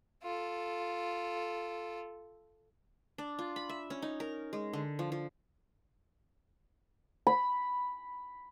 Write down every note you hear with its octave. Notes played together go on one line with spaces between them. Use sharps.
F4 A4
D4
F4
B5
E5
C#4
D#4
A#4
G#3
D3
F3
F3
B5